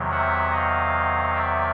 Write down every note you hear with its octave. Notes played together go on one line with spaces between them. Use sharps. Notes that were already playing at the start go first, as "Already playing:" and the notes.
Already playing: E2 C3 D#3 F#3
E5 F#5
D#5 F5
D5 E5